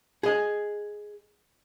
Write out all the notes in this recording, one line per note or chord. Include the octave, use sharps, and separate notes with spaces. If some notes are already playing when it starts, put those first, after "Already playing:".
G#4 D#5